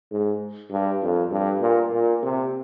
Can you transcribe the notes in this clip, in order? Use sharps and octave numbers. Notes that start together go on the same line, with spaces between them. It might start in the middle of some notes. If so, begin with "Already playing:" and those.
G#2
G2
F2
G2
A#2
A#2
C3